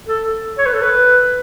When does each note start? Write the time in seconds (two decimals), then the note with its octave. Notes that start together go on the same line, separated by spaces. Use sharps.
0.08 A4
0.58 C#5
0.66 B4
0.74 A4
0.82 B4